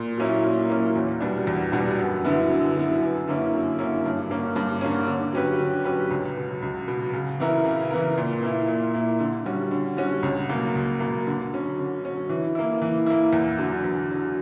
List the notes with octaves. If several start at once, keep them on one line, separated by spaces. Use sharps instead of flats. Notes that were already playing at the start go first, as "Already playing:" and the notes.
Already playing: A#2
F#3 A#3 C#4 E4
A#2
F#3 A#3 C#4 E4
E2
B2 G3 B3 D4
E2
B2 G3 B3 D4
F#2
D3 F#3 B3 E4
F#2
D3 F#3 B3 E4
F#2
D3 A#3 C#4 E4
F#2
D3 A#3 C#4 E4
G2
D3 A#3 C#4
G2
D3 A#3 C#4
D3
F#3 C#4 G4 B4
D3
F#3 C#4 G4 B4
C#2
B2 F#3
C#2
B2 F#3
C#3
E3 B3 E4 A#4
C#3
E3 B3 E4 A#4
A#2
A#3 E4
A#2
A#3 E4
D3
G3 C#4 F#4
D3
G3 C#4 F#4
C#2
B2 F#3 A#3
C#2
B2 F#3 A#3
D3
F#3 C#4
D3
F#3 C#4
E3
A#3 E4
E3
A#3 E4
E2
D3 F#3
E2
D3 F#3